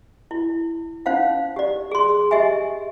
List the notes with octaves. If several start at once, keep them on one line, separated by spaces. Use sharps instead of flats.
E4
C#4 D#4 C5 F5 F#5
G4 D5
G#4 C6
G4 D#5 E5 G#5